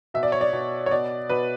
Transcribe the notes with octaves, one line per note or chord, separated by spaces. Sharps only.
B2 E5
D5
C#5
D5
B2
C#5
B2 D5
B2 B4